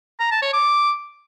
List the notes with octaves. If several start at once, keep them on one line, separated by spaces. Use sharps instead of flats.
A#5
A5
C#5
D6